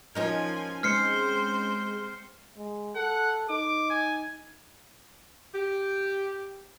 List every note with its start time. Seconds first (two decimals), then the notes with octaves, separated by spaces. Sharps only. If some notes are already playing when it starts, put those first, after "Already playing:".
0.15 F3 C#4 D#4 A#4 G#5
0.83 G#3 C4 C5 F6 C7 C#7
2.57 G#3
2.96 A4 F#5
3.50 D#4 D6
3.90 G#5
5.53 G4